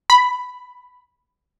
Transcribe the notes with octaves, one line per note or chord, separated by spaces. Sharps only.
B5